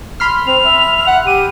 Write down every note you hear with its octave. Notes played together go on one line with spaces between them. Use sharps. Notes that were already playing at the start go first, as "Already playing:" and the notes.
B5 C6 F6
C4 F7
E5
F#5
G4 D#7